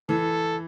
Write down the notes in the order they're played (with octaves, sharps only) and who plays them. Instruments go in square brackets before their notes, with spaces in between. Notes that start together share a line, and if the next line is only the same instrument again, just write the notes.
[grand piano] E3 [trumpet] A4